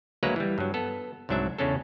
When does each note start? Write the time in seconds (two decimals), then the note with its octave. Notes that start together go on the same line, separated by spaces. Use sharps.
0.23 D2 F#3 G#3 A#3 B4 A#5
0.36 E3 G3
0.58 G2 F#3
0.74 B3 A4
1.29 C2 G#2 F#3 D4 E5
1.59 E2 C#3 C#4 D4 A4